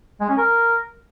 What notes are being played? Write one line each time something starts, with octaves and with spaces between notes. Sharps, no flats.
G#3
C#4
A#4